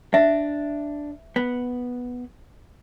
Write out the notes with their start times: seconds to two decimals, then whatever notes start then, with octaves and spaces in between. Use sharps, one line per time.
0.14 D4 E5
1.36 B3